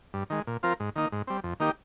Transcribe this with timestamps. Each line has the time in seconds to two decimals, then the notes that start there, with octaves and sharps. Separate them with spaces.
0.14 G2
0.30 D#3 G#3
0.47 A#2
0.63 F3 C4 F4 A#4
0.80 G#2
0.96 D#3 A#3 D#4
1.12 G#2
1.27 G3 C4
1.44 F2
1.60 D#3 A#3 D#4 G4